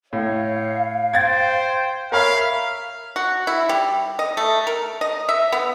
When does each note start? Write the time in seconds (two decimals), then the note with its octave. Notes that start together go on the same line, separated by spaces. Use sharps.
0.13 A2 C#5 F5
1.13 C5 G5 G#6 A6
2.12 A#4 C#5 E5 F5 B5
3.16 F#4
3.47 E4
3.69 G3
4.19 D#5
4.37 A3
4.67 A#4
5.01 D#5
5.29 E5
5.52 B3